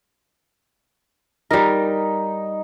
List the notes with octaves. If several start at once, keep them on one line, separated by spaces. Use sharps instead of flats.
G3 D#4 A#4